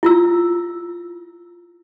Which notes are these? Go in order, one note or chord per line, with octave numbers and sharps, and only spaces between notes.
E4 F4 E6